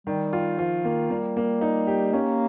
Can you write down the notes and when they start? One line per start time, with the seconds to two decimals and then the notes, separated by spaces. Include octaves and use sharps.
0.07 D#3 G3
0.33 F4
0.58 F3 F4
0.85 D#3 A#3
1.10 G3 A#3
1.37 A#3
1.61 D#4
1.87 G4
2.13 A#3 C#4